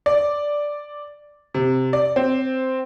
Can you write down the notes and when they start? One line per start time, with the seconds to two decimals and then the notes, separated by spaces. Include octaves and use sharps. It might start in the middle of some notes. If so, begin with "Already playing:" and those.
0.06 D5
1.54 C3
1.93 D5
2.16 C4